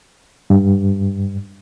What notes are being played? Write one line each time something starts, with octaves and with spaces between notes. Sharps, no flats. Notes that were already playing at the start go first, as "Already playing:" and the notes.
G2